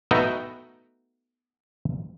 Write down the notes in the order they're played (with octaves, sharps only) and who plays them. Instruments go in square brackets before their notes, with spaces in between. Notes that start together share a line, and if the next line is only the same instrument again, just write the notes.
[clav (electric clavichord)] A3 B3 D#4 F#4 G5